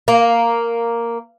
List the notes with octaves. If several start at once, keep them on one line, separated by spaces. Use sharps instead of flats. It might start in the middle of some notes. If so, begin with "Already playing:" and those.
A#3